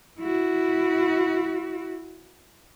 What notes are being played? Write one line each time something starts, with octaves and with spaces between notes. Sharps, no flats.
E4 F#4